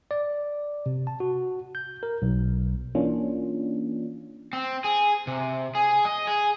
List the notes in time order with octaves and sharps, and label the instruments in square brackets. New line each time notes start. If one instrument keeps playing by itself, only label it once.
[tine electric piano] D5
C3
A5
F#4
G6
A#4
B1
[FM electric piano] E3 A#3 C#4 D4 F4
[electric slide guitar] C4
G#4
C3
G#4
D#5
G#4